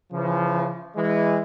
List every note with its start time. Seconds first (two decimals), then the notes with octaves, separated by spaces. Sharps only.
0.12 C#3 E3 F3
0.97 E3 G#3